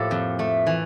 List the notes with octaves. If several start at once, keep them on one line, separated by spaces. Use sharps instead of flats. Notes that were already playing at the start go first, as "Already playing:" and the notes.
Already playing: A2 F3 A#3 G4 A4
F2
A3
E3